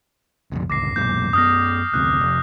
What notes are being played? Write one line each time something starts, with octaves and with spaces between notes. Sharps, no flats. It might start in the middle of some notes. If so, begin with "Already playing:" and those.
F1 A#1 F2
G1 C#2 D6 A#6 C7
B1 F#2 A#2 G6
F#2 B3 D#6 F6 A#6
F1 D2 C3 F#6
F1